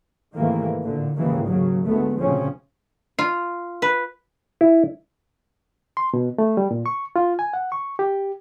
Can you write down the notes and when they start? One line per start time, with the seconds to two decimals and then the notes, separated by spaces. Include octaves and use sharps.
0.35 G#2 C3 D#3 E3 A3 A#3
0.84 A1 A#2 D3
1.17 D#2 G#2 C#3 E3 A#3
1.47 D#2 C#3 F#3
1.85 D2 G#3 A3 B3
2.17 D2 A#2 C#3 F3 C4 C#4
3.19 F4
3.82 B4
4.61 E4
5.97 C6
6.14 B2
6.38 A3
6.57 G3
6.71 A#2
6.86 C#6
7.16 F4
7.39 G#5
7.53 F#5
7.72 C#6
7.99 G4